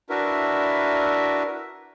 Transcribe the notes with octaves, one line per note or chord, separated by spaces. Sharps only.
D4 E4 F#4 A#4 B4 E5